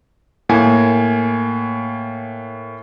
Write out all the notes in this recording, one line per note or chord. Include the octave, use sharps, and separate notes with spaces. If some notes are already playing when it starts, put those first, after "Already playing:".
A2 A#3 G#5